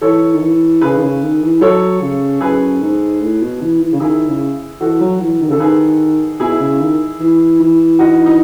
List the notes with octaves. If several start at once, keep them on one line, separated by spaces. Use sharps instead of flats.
E3 A4 C#5
D#3
E3
C#3 G#4 B4
D#3
C#3
D#3
E3
F#3 A4 C#5
C#3
F#2 G#4 B4
G#2
A2
B2
E3
E3
C#3
D#3 E4 G#4
C#3
E3 F#4 A4
F#3
E3
D#3
C#3 A4
D#3 G#4 B4
B2 E4 G#4
C#3
D#3
E3
E3
D#4 F#4
D#4